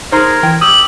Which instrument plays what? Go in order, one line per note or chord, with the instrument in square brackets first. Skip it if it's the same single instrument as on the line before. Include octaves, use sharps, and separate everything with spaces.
[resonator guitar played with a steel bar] D#4 G#4 [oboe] A#4 [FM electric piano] C5 A#5 C6 [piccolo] G#6
[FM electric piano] E3 [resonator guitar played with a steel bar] G5
[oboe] G4 [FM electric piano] D#6 E6 [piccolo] F#7